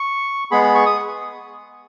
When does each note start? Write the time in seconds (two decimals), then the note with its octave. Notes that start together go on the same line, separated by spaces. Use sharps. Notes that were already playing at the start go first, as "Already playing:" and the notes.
Already playing: C#6
0.51 G#3 B3 G#4 B5
0.63 B5
0.75 C#6
0.86 D#6